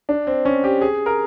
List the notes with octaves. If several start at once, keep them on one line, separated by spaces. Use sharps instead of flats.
D4
C4
C#4
G4
G#4
A#4